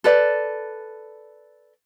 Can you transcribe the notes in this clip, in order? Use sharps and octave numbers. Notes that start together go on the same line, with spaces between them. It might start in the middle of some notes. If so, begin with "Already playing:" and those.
A4 B4 D5